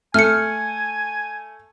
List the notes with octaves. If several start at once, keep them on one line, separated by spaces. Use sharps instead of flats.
A3 G#5 F6 C#7